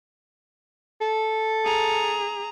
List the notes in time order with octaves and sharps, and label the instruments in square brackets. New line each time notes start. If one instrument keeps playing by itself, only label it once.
[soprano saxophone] A4
[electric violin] G#4 A#5